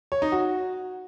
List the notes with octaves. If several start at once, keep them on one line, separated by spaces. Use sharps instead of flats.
C#5
D#4
F#4